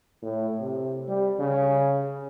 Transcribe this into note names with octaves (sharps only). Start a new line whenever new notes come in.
A2
C3
G3
C#3